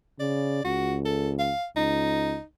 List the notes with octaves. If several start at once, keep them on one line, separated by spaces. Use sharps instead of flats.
C#3 D5
C#2 F#4
A4
F5
C#2 D#4